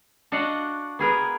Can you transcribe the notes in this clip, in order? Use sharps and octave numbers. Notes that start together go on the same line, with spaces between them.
D4 F#4 D#5 F5 F#5
B3 G#4 A#4 B4